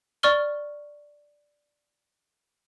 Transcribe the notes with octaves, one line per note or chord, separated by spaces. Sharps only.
D5 C#6 F6 G7